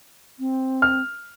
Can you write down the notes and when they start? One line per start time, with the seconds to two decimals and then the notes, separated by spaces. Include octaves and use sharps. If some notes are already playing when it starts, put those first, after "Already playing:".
0.40 C4
0.82 F6